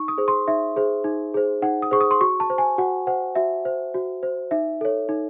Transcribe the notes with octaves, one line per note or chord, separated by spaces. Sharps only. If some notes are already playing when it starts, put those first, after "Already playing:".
Already playing: D#4 C#6
D#6
G#4 C5
C6
D#4 E5
G#4 C5
D#4
G#4 C5
D#4 F#5
D#6
G#4 C5 C#6
D#6
C6
F#4 C#6
A5
C5
G#5
F#4 F#5
C5 F#5
F#4 E5
C5
F#4
C5
D#4 E5
A4 C#5
D#4